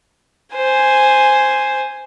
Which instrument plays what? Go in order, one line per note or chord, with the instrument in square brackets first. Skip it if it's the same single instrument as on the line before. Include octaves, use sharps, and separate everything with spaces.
[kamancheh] C5 G#5